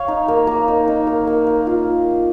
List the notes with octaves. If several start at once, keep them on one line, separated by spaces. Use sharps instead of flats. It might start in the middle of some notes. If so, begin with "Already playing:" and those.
Already playing: C#5 F5
D#4
A#3
A#3
D#4
D#4
A#3
A#3
A#3
F4